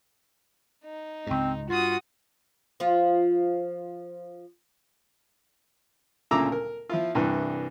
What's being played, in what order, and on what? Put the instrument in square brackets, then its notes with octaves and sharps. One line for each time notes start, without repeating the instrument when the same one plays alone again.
[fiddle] D#4
[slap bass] C#2 G#2 [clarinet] C4
[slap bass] G2 [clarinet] F4 [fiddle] F#4 D#6
[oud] F3 F4
[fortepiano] D2 A#2 C#3 A#5 D6 E6
A#4
F3 E4 F4
C2 G2 E3